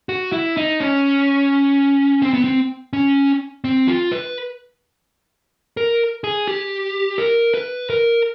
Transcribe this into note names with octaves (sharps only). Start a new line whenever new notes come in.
F#4
E4
D#4
C#4
C4
B3
C4
C#4
C4
F4
B4
A#4
G#4
G4
A#4
B4
A#4